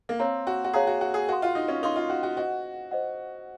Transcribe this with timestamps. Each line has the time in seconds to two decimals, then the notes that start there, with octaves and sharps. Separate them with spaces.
0.09 A#3
0.19 C4 C#5 F5 A#5
0.47 F#4
0.64 F#4
0.73 G#4 C#5 F5 A#5
0.87 F#4
1.01 F#4
1.14 G#4
1.28 F#4 A#4 F5 C6
1.42 F4
1.55 D#4
1.68 C#4
1.82 D#4 A#4 F5 C6
1.96 F4
2.09 F#4
2.23 F#4
2.37 F#4 C5 D#5 F#5
2.91 C5 D#5 F#5